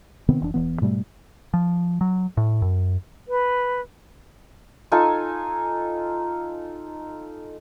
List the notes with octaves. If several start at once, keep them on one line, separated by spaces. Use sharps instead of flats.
C3 D#3 B3 C4
F1 E3 D4
E1 E3 B3
G#2 B2 G3 A3
F3
F#3
A2
F#2
B4
D#4 F4 A4 G#5